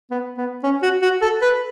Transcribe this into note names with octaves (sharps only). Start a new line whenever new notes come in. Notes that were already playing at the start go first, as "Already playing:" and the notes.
B3
B3
C#4
F#4
F#4
A4
B4